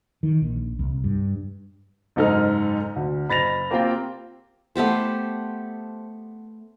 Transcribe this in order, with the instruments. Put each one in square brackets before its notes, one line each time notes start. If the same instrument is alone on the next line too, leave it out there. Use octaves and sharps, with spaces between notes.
[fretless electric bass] D#3
A#1
C2
G2
[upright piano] F#1 G#2 D#4 A4 F6
D2
F#1 B5 A6 A#6 F7
A#3 C4 F4 G4 F5 G5
[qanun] A3 B3 G4 C5